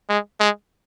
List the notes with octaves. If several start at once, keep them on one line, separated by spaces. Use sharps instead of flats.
G#3
G#3